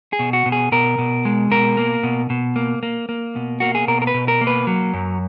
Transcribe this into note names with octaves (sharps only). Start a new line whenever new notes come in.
G#4
B2
F#4
B2
G#4
B2 A#4
B2
G#3
B2 A#4
A#3
B2
B2
A#3
A#3
A#3
B2
A#3 F#4
G#4
B2 A#4
A#4
B4
B2
A#4
A#3
B4
F#3
F#2